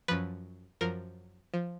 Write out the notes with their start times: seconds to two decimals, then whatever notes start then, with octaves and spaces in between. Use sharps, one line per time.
0.08 F#2 F3 B4
0.81 F#2 F3 A#4
1.54 F3